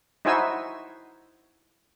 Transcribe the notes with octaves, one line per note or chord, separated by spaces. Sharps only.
D#4 E4 F#4 C5 G#5 E6